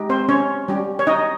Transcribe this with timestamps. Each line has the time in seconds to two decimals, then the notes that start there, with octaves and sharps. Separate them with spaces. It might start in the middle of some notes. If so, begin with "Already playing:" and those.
Already playing: G#3 D#4 G4
0.09 C4 C5
0.29 C#4 C#5
0.68 G3 C#4 G4
0.99 C#5
1.07 D#4 D#5